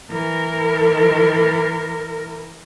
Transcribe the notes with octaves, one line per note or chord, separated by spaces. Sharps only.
E3 A#4